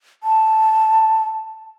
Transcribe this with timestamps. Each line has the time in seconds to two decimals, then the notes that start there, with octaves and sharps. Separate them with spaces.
0.23 A5